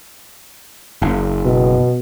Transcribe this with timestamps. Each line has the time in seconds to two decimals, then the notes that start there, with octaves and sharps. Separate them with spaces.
1.02 F#1
1.45 B2